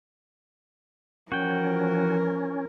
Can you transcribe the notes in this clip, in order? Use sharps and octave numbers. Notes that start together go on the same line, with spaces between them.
E3 F3 C#4 F#4 A#4 G5